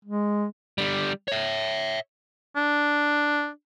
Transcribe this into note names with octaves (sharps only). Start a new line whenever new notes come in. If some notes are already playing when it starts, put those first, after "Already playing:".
G#3
D3 G3
C#5 E5
D4